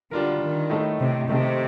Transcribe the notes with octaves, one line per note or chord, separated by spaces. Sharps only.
D3 G3 D4 F4 A#4
D#3
A2 A3 D#4 A4
C3
C3 D#3 A3 D#4 A4